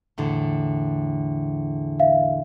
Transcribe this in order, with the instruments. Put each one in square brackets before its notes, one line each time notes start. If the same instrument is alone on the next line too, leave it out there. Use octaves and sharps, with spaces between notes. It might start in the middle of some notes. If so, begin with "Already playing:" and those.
[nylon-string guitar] E2 A2 D3
[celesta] E5 F5